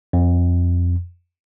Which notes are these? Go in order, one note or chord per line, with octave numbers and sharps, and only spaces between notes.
F2